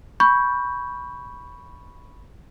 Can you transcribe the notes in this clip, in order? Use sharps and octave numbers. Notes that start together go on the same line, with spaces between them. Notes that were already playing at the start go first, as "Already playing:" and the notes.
B5 C#6 G6